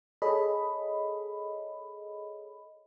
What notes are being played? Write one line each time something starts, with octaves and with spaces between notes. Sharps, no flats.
G#4 A4 C#5 D#5 B5